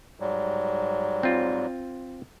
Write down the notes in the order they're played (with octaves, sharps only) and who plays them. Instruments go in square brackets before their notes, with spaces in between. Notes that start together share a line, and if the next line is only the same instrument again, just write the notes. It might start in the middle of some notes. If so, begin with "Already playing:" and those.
[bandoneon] G#2 F#3 G3
[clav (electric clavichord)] C4 F4